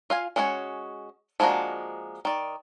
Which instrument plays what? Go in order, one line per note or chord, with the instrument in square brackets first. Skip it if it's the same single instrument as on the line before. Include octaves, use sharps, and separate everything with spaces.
[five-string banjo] F4 F5 G#5
G#3 C#4 D4 F#4 C#5
F3 G#3 A#3 D4 F#4
D#3 D5